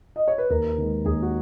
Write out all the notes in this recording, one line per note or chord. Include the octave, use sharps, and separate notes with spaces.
D#5
C#5
B4
D#2 A#4
D#3 G#3
D#2 G#4
F#4